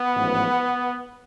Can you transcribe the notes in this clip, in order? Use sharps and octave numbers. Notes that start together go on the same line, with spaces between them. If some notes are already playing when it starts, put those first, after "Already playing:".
Already playing: B3
A1 G#2 F3